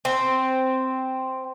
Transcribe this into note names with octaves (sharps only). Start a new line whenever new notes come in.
C4